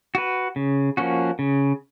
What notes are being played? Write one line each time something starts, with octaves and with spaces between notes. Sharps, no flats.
F#4 B4
C#3
F3 A#3 C#4 F#4
C#3